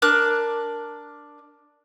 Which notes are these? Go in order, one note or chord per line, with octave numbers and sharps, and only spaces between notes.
D4 A#4 D6 F#6